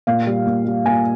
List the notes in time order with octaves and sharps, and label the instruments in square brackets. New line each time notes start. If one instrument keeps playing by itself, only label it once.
[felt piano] A#2 F5
G3
A#2
G3
A#2 G#5